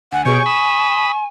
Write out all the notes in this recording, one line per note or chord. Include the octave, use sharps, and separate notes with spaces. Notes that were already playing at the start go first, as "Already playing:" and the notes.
D2 F#5 G#5
B2 G4 G#4 C#5 C#6 D7
B5 D#6 E7